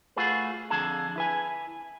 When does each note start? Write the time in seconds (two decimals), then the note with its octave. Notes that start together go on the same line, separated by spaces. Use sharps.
0.16 A3 F4 F#4 G#4 B4
0.70 F2 D3 G#4 A5
1.16 E4 B4 G#5